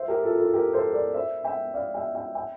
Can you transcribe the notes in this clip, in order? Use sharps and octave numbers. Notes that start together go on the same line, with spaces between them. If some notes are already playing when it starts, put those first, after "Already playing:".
Already playing: C5 E5
G4 A#4
F4 A4
F4 A4
G4 A#4
A4 C5
A#4 D5
C5 E5
E5 G5
D5 F5
E5 G5
E5 G5
E5 G5